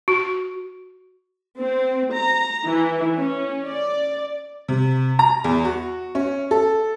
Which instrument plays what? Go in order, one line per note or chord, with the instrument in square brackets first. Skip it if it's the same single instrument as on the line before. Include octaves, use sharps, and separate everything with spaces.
[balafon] F#4
[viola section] C4
A#5
E3
C#4
D5
[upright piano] C3
A#5
E2
F#4
C#4
A4